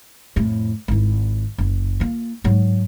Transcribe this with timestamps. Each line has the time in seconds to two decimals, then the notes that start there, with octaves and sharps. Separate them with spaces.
0.36 F2 A2
0.88 G#1 E4
1.58 F#1
2.00 A#3 F4
2.44 G#2 F#3